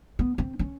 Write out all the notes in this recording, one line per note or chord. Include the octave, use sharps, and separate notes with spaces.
B3
C4
C#4